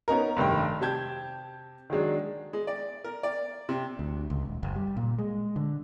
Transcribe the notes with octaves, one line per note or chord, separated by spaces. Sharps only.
B3 C#4 D#4 A#4
F1 G2 D#3 G5
C3 G4 G5 A5 G6 G#6
D#3 F#3 G#3 D4
G#3
D5
A#4
D5
C3
D2
C#2
D#1
F#1
G3
A#2
G#3
D3